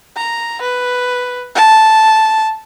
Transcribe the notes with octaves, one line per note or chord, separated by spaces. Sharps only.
A#5
B4
A5